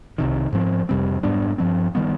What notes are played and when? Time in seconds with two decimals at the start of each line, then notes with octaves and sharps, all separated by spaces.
0.18 C2 C3 D#3
0.53 G#2 F3 C4
0.89 F2 C3 G3 C4
1.23 G#2 G3 B3 D4
1.58 G2 F3 C4
1.95 D#3 G3 B3